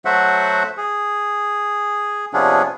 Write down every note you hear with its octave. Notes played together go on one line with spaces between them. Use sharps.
F#3 A3 F#4 C5 E5 F#5
G#4
C3 F3 B3 C#4 D4 G#4